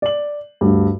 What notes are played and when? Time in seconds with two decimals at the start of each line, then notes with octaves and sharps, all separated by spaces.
0.02 D5 F#7
0.61 D2 G2